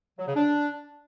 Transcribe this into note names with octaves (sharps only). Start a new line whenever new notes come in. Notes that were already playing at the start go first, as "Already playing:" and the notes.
F#3
C#3
D4